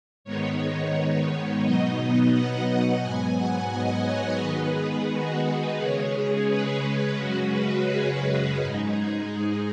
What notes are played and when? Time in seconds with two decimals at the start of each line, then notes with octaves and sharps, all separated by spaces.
0.24 G#2 D#3 G#3 B3 D#4 C#5
1.63 B2 F#3 B3 D#4 D#5
2.33 F#5
3.02 G#2 F#3 B3 G#5
3.36 F#5
3.71 D#5
4.06 C#5
4.40 D#3 G#3 B3 D#4 B4
4.75 G#4
5.10 F#4
5.79 C#3 G#3 C#4 G#4
6.13 G#4
6.48 B4
7.17 F#2 C#3 G#3 C#4 F#4
7.52 B4
7.87 G#4
8.21 F#4
8.56 G#2 G#3 D#4
8.91 G#4